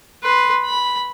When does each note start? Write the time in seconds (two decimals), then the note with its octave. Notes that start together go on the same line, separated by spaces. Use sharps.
0.23 B4 C6
0.65 B5